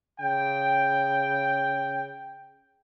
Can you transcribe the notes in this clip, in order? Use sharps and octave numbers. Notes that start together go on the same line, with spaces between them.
C#3 G5